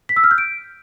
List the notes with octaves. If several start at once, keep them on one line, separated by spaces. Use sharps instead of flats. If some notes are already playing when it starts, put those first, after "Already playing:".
B6
E6
F6
G6
D7